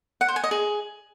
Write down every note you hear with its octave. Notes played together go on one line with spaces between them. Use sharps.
F#5
C5
G#5
D#5
G#4